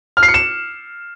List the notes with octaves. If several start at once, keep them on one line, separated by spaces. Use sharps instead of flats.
F6
C7
C#7
E7